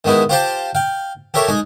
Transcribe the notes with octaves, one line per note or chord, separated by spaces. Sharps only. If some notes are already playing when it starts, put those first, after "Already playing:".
D#3 G#3 B3 D#4 E4
F4 G4 C5 F5 G5 A5
F5 G5
G4 A4 A#4 C#5 E5
G#3 D#4 G#5